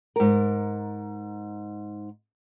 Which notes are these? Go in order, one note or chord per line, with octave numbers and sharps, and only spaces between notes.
G#2 A#4